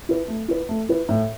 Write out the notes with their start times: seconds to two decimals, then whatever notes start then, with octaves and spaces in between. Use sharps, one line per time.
0.09 E4 B4
0.28 A3
0.48 E4 B4
0.69 A3
0.89 E4 B4
1.09 A2